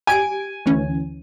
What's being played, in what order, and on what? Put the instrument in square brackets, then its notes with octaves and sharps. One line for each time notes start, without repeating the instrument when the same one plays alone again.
[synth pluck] G4 D7 [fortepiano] G#5
[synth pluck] D2 E3 C#4